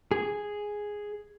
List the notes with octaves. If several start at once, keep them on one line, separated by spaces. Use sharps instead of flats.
G#4